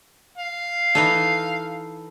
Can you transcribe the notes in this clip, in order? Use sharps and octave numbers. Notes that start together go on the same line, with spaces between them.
F5
E3 D#4 A4